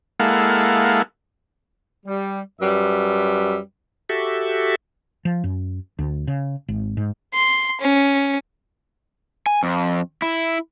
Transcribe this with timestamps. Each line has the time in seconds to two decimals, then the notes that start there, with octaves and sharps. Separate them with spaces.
0.20 G#3 A#3 E4 A4 F5 F#5
2.06 G3
2.61 F#2 G3 B4 E5
4.09 F#4 G4 A4 E5
5.25 F3
5.44 F#2
5.99 D2
6.27 C#3
6.68 G#1
6.97 G#2
7.34 C6
7.81 C#4
9.46 G#5
9.63 F2
10.22 E4